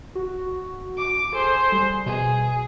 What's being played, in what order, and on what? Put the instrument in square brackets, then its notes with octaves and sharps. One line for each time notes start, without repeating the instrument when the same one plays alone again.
[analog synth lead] F#4
[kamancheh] D6
[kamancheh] G#4 C5 [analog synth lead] A4
[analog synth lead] G3
[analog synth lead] B2 [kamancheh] G#4